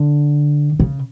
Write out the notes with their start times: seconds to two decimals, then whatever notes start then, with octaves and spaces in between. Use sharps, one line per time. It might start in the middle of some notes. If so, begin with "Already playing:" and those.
Already playing: D3
0.80 C#3